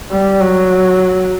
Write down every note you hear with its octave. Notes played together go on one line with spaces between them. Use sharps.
G3
F#3